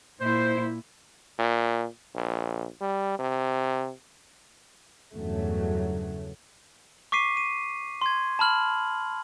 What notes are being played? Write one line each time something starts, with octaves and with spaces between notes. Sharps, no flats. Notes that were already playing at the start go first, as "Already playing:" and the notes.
A#2 E4 C5
A#2
A#1
G3
C3
E2 G2 C#3 F#3 A3
C#6 D6 B6 C7 D#7
D#7
C6 G#6
A5 B5 F6 F#7